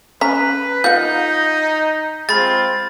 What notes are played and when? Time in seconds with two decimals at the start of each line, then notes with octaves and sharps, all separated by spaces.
0.21 C#4 B4 A#5 B6
0.84 D#4 F4 F#5 G6
2.29 G#3 C4 F4 B5 A6